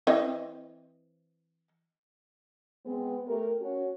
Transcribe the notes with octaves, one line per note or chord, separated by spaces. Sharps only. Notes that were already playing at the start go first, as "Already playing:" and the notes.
E3 C4 D#5
G#3 B3 C4
A3 G4 A#4
C#4 F#4